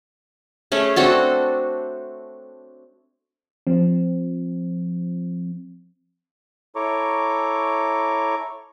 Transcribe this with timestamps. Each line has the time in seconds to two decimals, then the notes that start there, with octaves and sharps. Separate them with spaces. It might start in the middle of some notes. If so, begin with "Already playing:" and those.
0.72 A3 C#4 G#4
0.96 C4 D4 F#4 A4
3.67 F3 C4
6.76 E4 A4 C#5 A#5 C#6 D6